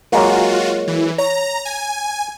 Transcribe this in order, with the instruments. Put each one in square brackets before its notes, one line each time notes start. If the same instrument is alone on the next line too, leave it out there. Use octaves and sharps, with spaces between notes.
[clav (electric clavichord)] F#3 G#3 A#3 [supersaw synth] F4 F#4
[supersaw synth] E3
[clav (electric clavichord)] C#5 [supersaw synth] A#5
[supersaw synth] G#5